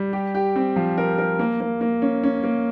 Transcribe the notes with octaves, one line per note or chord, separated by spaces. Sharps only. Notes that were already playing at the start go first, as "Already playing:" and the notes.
Already playing: G3
G4
G4
C4
F3
A#4
A#4
A#3
A#3
A#3
C#4
C#4
A#3